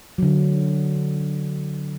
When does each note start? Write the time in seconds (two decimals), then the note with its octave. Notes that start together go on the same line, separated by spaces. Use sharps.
0.18 D3 F#3